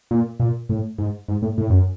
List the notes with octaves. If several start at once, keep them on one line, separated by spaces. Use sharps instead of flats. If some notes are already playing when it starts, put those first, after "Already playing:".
A#2
A#2
A2
G#2
G#2
A2
A2
F#2